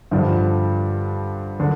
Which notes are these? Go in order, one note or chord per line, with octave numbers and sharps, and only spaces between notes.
G2 D3 F3
D3